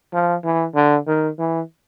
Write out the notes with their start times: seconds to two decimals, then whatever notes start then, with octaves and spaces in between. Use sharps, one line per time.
0.13 F3
0.44 E3
0.75 D3
1.07 D#3
1.39 E3